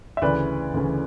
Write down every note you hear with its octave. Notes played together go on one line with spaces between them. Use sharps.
E5
D2 C#3 E3 B4 D5
D2 C#3 E3